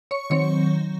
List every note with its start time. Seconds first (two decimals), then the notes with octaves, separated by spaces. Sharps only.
0.11 C#5 C#6
0.30 D#3 F#3 C4 C#5 C#6